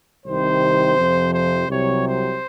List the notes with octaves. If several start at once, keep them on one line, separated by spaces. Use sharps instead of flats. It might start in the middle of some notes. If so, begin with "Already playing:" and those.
C2 C3 D#3 C5
F2 C3 F3
C5
C2 C3 F#3 C#5
C5